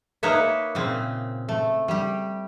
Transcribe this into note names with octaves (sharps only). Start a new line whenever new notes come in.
A#3 D#4 B4 C#5 E5
A#2 C#3 C4
A3
G3 G4